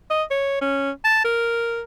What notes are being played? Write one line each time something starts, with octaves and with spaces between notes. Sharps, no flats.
D#5
C#5
C#4
A5
A#4